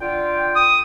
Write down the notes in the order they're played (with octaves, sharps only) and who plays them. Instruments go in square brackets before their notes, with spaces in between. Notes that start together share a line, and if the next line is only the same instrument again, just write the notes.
[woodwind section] D3 F4 G5
[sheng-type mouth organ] D#6